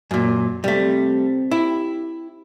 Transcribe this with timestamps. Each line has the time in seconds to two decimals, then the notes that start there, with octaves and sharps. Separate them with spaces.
0.11 F#2 A#2
0.64 C3 G3 A3
1.51 E4 G4